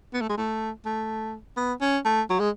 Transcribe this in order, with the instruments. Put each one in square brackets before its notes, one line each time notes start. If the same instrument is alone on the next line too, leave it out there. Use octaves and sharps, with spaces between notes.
[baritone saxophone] B3
A3
G#3
A3
A3
B3
C#4
A3
F#3
G#3